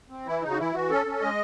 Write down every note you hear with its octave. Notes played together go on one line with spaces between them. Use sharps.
C4
E3 E4
C#3 D#4
F#4
E3 E4
E3 F#4
C#4 A4
C#4
G#3 D#5